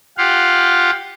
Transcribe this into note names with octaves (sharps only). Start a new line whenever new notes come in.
F4 G4 F5 F#5